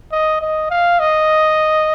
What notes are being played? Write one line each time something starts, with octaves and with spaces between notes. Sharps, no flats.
D#5
D#5
F5
D#5